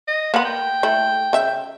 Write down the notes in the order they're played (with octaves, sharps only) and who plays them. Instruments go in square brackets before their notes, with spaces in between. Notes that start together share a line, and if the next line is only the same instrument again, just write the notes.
[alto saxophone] D#5
[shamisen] A#3 B5 [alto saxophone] B3
[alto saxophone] G5
[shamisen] A3 E4
C#3 E5